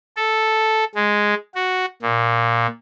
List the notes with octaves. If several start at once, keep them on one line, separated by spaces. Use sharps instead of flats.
A4
G#3
F#4
A#2